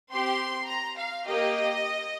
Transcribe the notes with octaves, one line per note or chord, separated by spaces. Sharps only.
C4 G4 C6
A#5
F5
A#3 G4 D#5